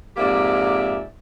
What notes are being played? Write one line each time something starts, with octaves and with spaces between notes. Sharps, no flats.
F2 G#2 A#3 G4 D5 E5